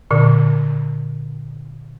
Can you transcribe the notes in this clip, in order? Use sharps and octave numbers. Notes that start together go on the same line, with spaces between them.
A#2 D3